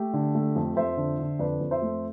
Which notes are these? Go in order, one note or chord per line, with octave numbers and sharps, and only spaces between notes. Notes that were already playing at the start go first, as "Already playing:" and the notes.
Already playing: A3 G4
D3
A3
F2
F2 C5 E5
D3
D3
F2 B4 D5
F2
C5 E5
A3